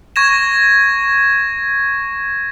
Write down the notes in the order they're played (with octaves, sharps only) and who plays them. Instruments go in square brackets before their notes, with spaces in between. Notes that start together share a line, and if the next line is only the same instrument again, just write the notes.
[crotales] C#6 G#6 A#6 E7